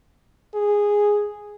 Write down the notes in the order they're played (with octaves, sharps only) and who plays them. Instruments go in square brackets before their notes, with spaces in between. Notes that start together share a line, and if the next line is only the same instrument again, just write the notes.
[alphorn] G#4